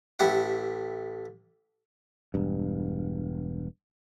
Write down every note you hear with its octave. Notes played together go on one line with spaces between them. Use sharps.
A1 A3 E4 G4 F#5
E1 G2